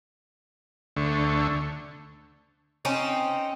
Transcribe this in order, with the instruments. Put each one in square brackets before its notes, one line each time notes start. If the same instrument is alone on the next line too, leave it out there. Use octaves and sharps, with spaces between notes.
[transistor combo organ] D2 D3 A3 C#6
[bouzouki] C4 C#4 D#4